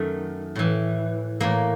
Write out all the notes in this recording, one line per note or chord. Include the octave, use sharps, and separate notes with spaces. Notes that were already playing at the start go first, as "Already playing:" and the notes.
Already playing: F#2 D#3 A3
A2 E3
A2 E3 A#3